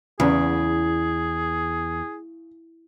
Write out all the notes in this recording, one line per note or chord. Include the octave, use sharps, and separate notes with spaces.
E2 C#3 G#4